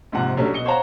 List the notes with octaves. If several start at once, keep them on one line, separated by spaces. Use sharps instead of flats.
A#1 G#2 C3 F#5
D3 F#3 G3 A3 C#4 D4
B2 D#5 C#7 G7
C5 C#5 F5 F#5 A5 A#5